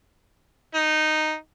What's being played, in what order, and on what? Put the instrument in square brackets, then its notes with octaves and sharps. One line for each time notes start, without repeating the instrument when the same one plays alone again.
[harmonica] D#4